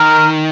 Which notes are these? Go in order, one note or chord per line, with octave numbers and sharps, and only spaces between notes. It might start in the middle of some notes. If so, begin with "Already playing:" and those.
Already playing: D#3 A#4